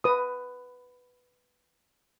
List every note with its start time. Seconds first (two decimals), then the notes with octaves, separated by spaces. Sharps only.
0.04 B4 D#6